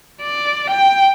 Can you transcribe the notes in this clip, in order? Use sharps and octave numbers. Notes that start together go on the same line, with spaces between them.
D5
G5